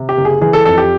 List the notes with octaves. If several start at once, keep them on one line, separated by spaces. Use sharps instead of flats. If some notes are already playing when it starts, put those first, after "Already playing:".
Already playing: C3
G4
F#1
G#4
E3 G#4
A4
F2 A4
G4